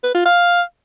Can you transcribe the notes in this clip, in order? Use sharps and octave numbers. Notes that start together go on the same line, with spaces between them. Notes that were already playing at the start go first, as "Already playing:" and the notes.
B4
F4
F5